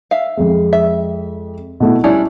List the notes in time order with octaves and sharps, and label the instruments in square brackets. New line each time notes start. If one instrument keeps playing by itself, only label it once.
[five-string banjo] E5 F5
[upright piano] F2 G#3
[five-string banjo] E5
[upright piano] B2 A3 E4
[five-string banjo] G3 C#4 D4 [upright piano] E4